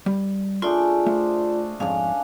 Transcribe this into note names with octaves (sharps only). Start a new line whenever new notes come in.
G3
A3 D4 F4 G#4 D5 C6
A3 C5 F5
F2 G#2 C#4 D4 F5